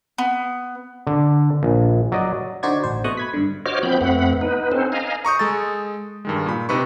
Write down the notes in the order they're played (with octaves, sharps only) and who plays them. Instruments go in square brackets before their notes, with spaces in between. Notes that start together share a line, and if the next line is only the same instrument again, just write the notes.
[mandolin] B3
[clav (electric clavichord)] D3
A#1
F#3 D5 D#5
[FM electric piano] D3 D#4 F#4 C5 D5 G#6
A1 C5
B2 A3 D#5 C#6 D#6 F#6
B5 G#6 B6
G2 D3
[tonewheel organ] F#4 C5 C#5 D#5 D6 F6
F3 B3 C4 B5 G6
F2 A3 B3 C4 F#5 B5
B3 D#4 B4
C4 C#4 D#4 A4 C5
D#5 F5 G#5 A#5
[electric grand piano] A#5 C#6 D#6 G6
G#3 A4 A6
G2 D#3 G#3
A#2 B5
C3 D#4 B4 B5 C#6